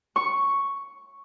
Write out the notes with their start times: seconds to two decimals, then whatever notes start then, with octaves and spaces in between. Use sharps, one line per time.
0.16 C#6